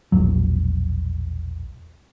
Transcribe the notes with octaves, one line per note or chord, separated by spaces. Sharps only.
E1 A#1 F#3